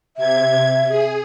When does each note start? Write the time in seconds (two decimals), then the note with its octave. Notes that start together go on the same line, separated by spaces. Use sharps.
0.17 C3 E5 G#6
0.88 G#4